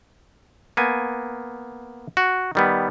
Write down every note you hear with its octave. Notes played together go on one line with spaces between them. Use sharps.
A#3 B3 G#5
F#4
D#3 G3 B3